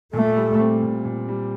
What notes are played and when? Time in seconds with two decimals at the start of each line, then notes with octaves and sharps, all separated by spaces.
0.13 A#2 A3
0.37 G3
0.60 C4
0.82 A#2
1.05 A#2
1.29 G3